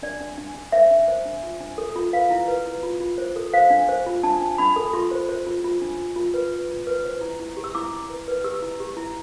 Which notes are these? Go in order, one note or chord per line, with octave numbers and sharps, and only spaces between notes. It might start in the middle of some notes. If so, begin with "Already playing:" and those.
D4 D5
D4
D4
D4
C5 E5
D4
C5
D4
F4
D4
A4
F4
B4 F5
E4
B4
E4
F4
F4
C5
A4
C5 F5
D4
C5
F4
D4 A5
D4
D4 B5
A4
F4 C6
C5
C5
F4
F4
D4
F4
F4
B4
F4
F4
B4
C5
E4
E4
G4
E6
E4 D6
E4
B4
B4
G4 E6
E4
G4
E4